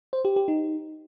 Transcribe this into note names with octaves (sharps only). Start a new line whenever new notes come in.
C5
G4
G4
D#4